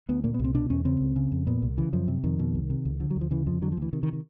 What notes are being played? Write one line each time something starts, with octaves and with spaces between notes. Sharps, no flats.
D2 B3
A#2 A#3
B3
C2 C4
B2 D4
E2 C#4
C#3 C4
C#2
C#3
F2
A#2 B3
C2
C#3 E3
F#2 F3
C3
F2 D#3
B2
C2
C3
C#2
D3 F3
F#3
D2
F3
C#3 E3
F2 F3
D3 F#3
F3
D2 E3
C3 D#3
D#3
D#3